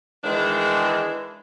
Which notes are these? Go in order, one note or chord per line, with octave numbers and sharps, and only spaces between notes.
D#3 E3 G#3 D4